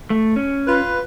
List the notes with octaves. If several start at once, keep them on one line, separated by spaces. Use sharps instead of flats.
A3
C#4
F4 B4